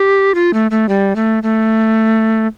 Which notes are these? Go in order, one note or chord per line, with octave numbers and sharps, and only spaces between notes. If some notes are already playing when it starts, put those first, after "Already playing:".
Already playing: G4
F4
A3
A3
G3
A3
A3